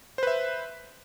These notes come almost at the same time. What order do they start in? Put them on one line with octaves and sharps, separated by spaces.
C5 B4 E5